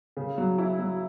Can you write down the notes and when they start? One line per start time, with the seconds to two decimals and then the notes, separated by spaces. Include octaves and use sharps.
0.17 C#3
0.38 F#3
0.58 E4
0.79 F#3